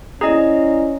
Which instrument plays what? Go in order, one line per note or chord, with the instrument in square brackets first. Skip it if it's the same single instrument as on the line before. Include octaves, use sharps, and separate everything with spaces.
[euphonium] C#4 [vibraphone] E4 D5 G#5 [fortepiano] G#4 [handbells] D#5 A#5